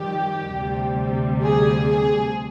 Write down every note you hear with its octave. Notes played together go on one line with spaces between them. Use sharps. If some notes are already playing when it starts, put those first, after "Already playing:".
Already playing: F2 D#3 G3 G4
D2 C3 G3
G#4
G#4